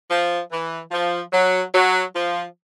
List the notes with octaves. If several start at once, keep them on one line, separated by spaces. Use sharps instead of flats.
F3
E3
F3
F#3
F#3
F3